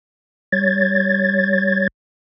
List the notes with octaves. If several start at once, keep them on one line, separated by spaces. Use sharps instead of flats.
G3 C#5 G#6 A6